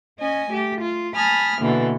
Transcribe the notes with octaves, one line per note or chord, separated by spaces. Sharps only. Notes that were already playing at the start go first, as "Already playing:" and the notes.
C#4 D#5 G#5
A3 G4
F4
G#5 A5 B5 D#6 F6
B2 D3 E3 A#3